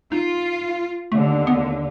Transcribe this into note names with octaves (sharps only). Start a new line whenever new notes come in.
D#4 F4
D#2 D3 A3
B3